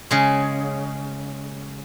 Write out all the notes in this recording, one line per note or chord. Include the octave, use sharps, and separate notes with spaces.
C#3 G#3